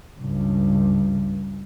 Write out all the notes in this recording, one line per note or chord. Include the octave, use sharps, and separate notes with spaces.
C#2 G2